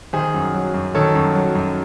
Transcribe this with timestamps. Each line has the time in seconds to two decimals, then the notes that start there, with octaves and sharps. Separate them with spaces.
0.13 D#3 G#4 C5
0.34 F#2
0.54 F#3
0.74 F#2
0.95 D#3 A4 C#5
1.15 F#2
1.35 F#3
1.55 F#2